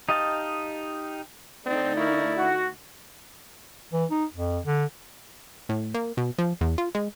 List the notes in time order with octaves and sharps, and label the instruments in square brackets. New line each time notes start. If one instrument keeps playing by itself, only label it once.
[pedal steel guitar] D#4 G4 D#5 F5 A5
[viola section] D3 A3 D#4 [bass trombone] C4 [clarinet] D5
[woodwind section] A#3 A#4 C#6 [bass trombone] E4
[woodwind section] F#4
[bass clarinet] E3
D#4
F2
D3
[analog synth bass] A2
A#3
B2
F3
E2
F4
G#3